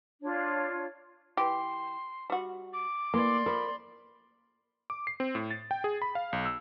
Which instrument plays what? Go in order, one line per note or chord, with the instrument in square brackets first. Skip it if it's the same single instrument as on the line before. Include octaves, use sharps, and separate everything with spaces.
[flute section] D4 F4 C#5
[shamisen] E3 G4 [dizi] C6
[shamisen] G3 F#4
[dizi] D6
[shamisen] E3 [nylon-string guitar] A#3 [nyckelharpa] D5 C6
[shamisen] F3 [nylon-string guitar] A#4 [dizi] B5
[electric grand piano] D6
C7
C4
A2
A6
G5
G#4
B5
F5
B1
E6